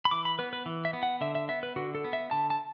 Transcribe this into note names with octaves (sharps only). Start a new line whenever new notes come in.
B5
E3 D6
B5
B3 B4
B4
E3
E5
B3
F#5
D3 E5
E5
B3 E5
B4
D3 F#4
A4
B3
E5
D3 A5
A5